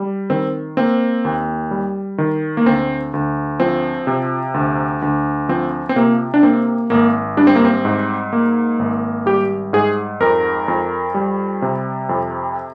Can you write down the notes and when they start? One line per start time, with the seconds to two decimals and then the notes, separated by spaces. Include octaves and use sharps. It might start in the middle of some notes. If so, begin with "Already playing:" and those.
Already playing: G3
0.30 D#3 C4
0.77 A#3 C4
1.25 D#2
1.71 G3
2.18 D#3
2.57 A#3
2.66 D2 C4
3.14 D2
3.60 F3 C4
4.07 C3
4.54 D2
5.02 D2
5.49 F3 C4
5.89 C4
5.96 C3 A#3
6.34 D4
6.43 A#3 C4
6.90 G#1 A#3
7.37 G3 D4
7.47 C4
7.55 A#3
7.65 C4
7.85 G#2
8.33 A#3
8.79 G#1
9.26 G3 G4
9.73 G#2 G#4
10.20 F2 A#4
10.68 F2
11.14 G3
11.62 C3
12.09 F2